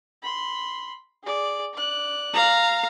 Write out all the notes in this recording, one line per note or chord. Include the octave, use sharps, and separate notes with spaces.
B5 C6
G#4 D5
D5 F#6
F5 A#5